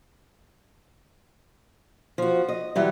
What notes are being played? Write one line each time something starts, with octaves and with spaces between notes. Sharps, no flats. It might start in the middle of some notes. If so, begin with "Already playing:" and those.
F3 F#4
D#5
E3 F#3 G3